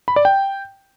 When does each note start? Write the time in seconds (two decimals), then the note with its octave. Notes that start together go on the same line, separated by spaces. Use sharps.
0.08 B5
0.16 D5
0.25 G5